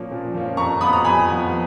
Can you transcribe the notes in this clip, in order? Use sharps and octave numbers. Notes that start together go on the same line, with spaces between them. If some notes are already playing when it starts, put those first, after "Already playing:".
Already playing: A#2 F3 A#3 C#4
A#2
F3 A#3 C#4
F2 A#5 C#6
F3 B3 B5 D#6
A#5
F2 G#5 B5
F3 B3